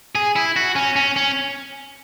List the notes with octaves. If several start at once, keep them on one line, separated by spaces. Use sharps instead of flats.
G#4
E4
F#4
C#4
C#4
C#4